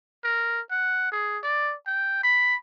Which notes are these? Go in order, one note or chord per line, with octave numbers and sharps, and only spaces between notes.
A#4
F#5
G#4
D5
G5
B5